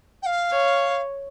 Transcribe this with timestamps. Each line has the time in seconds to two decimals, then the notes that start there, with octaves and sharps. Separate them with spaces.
0.23 G5
0.26 F5
0.51 C#5